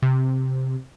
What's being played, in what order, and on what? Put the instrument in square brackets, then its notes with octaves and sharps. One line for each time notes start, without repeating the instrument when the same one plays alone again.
[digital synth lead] C3